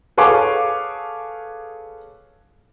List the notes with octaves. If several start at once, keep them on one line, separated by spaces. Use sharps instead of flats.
G#4 A4 B4 C#5 F5 D6